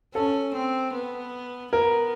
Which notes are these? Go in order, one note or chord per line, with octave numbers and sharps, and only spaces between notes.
C#4 A4
C4
B3
B3 A#4